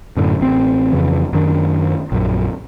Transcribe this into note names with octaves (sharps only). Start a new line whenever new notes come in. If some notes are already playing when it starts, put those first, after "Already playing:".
F#2 A2 D3
A1 C4
F2 C#3 E3
F#2 D#3 D4
A#1 F#2